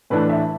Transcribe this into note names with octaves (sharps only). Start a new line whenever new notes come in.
A2 E3 A3 D4 B4
E5